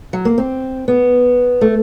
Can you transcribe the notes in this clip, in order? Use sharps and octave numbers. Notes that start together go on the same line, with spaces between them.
F#3
A#3
C4
B3
A3